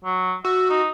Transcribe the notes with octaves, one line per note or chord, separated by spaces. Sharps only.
F#3
F#4 E5
D#4